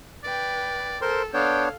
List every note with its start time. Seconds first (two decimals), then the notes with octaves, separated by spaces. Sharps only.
0.24 B4 D5 G5
1.02 A4 A#4 C5 C6
1.34 B3 D4 A4 C#5 F5 G5